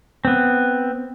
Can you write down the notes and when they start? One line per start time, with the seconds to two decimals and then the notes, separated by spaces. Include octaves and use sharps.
0.25 B3 C4